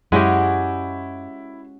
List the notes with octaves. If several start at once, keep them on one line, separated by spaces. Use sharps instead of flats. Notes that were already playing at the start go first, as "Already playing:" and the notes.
F#2 G#3 C#4 E4 F#4 G4